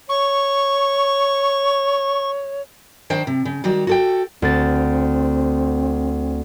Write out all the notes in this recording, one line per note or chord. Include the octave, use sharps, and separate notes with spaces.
C#5 C#6
D#3 D4 C5 G5
C3
C#3
D#3 G3 F#4 G4
F#4 A4 G5
D2 C4 A6